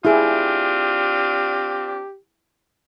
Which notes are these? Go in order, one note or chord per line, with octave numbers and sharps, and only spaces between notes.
C4 D4 E4 F4 G4 G#4